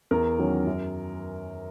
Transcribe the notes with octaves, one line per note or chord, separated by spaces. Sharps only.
E2 A#4
D#3 F#3 C#4
F#2